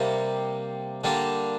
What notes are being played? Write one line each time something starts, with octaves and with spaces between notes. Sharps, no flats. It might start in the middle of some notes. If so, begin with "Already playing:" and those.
Already playing: C3 G3 A#3
D3 G3 A#3 D4